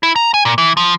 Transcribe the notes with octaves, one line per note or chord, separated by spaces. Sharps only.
E4
A#5
G#5
A#2
E3
F3